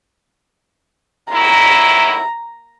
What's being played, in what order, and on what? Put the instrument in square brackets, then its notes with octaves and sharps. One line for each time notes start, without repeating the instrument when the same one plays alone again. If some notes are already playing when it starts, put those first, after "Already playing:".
[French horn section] D#3 F#3 E4 [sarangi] A#5